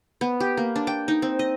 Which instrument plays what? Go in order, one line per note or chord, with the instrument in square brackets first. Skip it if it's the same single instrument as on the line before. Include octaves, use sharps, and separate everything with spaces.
[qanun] B3
G4
A#3
D4
G5
D#4
C4
D#5